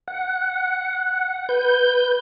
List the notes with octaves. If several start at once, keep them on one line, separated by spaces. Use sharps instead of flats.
F#5
B4 G6